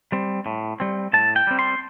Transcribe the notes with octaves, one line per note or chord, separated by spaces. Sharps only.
G3 C4
A2
G3 C4
A2 A5
G5
G3 C4
C6